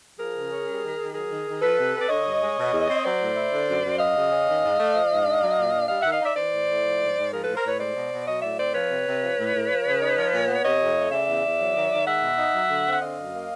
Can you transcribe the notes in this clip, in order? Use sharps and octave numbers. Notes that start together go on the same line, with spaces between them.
F3 G#4 A#4
C#3
C#4
G3
D#3
D#3
F#3 G#4 A#4
D#3
D#3
F3 A4 B4
C3
C4
D5
D3 C#5 D#5
G2
G#3
B2
E2
C4
F#3 C5 D5
A2
E4
D3
F#2
F#2
F#3 D#5 F5
C#3
C#4
D#3
G#2
A3
F3
G#2
D4
F#3
A#2
D4
G3 D#5 F5
D#3 E5 F#5
D#5 F5
D#4 D5 E5
E3 C5 D5
A2
A2
F3
G#2
G#2
F3 G#4 A#4
A2 A4 B4
A#4 C5
A2 B4 C#5
G#3 C5 D5
B2
B2
F#3 C#5 D#5
A2 D5 E5
C4 C5 D5
F3 B4 C#5
C3
C3
F3
A2
A2
F3
C#3
D#4
F3
A#2
B3
C3 C#5 D#5
F2
A3
C#3 D5 E5
E2
E2
F#3
D#3
D#3
G#3 E5 F#5
B2
D#4
F#3
D3
C4
F#5
D3 D#5 F5
F#2
A#3